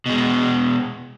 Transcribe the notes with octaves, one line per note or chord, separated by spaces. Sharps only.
B2 G#3